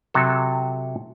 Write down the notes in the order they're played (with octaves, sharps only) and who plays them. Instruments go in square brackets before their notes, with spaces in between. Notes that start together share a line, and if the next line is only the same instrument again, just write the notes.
[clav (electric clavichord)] C3 F#3 A4